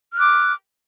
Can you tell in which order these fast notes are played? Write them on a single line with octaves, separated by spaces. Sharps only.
F6 F#6 D6